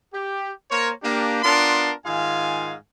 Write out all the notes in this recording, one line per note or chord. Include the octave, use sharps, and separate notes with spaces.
G4
A#3 A#4 C5 C#5
A#3 D4 G4
B3 D4 F4 A#4 A5 C6
G#2 D#3 F4 F5 G#5